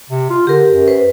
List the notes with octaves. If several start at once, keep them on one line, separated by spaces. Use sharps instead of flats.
C3
F4
D3 G4 A#4
F#2
B4 C5